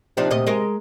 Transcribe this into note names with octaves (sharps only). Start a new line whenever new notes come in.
C3 F3 D4 D#4
D2 A#2 D#5
G#3 A#4 D#5